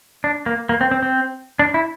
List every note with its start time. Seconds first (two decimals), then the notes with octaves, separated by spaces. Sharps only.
0.24 D4
0.46 A#3
0.69 A#3
0.81 C4
0.91 C4
1.03 C4
1.59 D4
1.74 E4